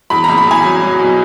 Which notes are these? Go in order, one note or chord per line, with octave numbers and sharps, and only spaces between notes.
E2 B5
F#1 A#5
B5
E2 G#5
F#3
F#3
B2